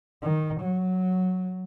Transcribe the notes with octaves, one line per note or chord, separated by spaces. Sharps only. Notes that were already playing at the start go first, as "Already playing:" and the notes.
D#3
F#3